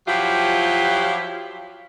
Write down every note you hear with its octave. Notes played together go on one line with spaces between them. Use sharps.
F3 F#3 E4 F4 G4